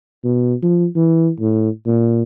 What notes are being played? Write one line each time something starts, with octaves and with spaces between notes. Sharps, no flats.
B2
F3
E3
A2
A#2